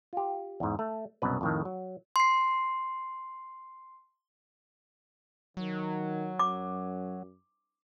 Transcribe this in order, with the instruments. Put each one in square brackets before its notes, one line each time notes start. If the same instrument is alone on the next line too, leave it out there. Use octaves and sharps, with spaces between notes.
[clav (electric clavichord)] F4 G4
E2 G#2
A3
C2 F#2 B2 B4
F2 A2 D#3
F#3
[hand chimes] C6 C7
[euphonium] D#3 [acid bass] F#3
[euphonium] F#2 [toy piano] D6